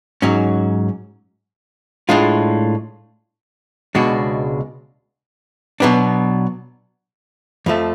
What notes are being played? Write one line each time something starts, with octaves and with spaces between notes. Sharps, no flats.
G#2 F#3 C#4
A2 G#3 D4 F4
C#2 B2 G#3 D4 F#4
B2 F#3 B3 D4
F2 F3 A3